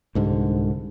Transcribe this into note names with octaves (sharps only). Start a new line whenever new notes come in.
C2 G#2 D3